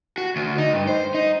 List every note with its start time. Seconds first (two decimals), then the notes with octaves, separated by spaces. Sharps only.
0.18 F#4
0.36 D2
0.58 D#4
0.73 G2
0.87 C5
1.14 D#4